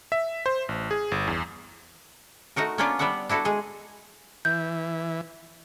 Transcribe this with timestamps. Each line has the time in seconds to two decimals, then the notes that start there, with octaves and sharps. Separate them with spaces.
0.12 E5
0.46 C5
0.69 A1
0.91 G#4
1.11 G1
1.27 E2
2.56 A3 D#4 F#4 A#4
2.78 A#3 B3 C#4 D4 F4 D5
2.99 G3 B3 D4 E5 F#5
3.29 D4 E4 F#4 A4
3.45 G#3 G#4
4.45 E3 G6